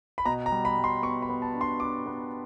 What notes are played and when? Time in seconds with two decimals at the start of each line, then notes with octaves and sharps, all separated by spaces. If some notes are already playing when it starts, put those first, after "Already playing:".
0.18 B5
0.25 B2 A#5
0.46 A#5
0.52 G3
0.65 B5
0.78 G3
0.84 C6
1.03 B3 C#6
1.22 B5
1.29 B3
1.42 A5
1.54 D4
1.61 C6
1.80 D4 D6
2.06 B3